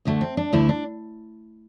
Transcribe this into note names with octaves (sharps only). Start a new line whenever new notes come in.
D2 D3 A3
C4
D4
D2 D3 A3 E4
D4